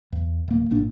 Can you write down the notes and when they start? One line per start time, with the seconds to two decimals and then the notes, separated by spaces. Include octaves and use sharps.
0.12 E2
0.48 D1 A#3
0.71 G#1 A#2 D4